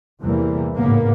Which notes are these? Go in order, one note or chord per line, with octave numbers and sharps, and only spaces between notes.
E2 C3 E3 G3 A#3
G#1 A2 C#3 A#3 B3